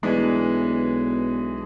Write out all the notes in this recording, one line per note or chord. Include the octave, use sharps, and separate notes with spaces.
B1 E3 G#3 D4